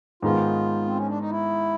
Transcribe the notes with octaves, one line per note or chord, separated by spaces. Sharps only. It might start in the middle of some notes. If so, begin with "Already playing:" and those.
G#2 D#3 G#3 B3 F4
C4
C#4
D4
D#4
E4